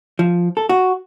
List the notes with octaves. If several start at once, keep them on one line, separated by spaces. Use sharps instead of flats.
F3
A4
F#4